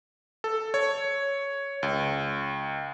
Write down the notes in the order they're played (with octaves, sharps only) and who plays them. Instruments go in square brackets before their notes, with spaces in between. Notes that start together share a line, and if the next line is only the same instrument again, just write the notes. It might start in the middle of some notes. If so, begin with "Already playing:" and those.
[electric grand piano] A4
C#5
C#2